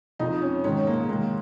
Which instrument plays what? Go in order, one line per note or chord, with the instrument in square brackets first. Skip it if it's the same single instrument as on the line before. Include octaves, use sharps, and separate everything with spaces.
[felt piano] F2 F3 D#4
C#4
G#2 D#3 C#4
A#3
G#2 D#3 A#3